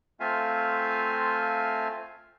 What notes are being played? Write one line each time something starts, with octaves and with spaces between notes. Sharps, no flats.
A3 C4 F4 E5 F5 G#5